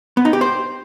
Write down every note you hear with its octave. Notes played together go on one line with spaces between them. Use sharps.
B3
D#4
G4
C5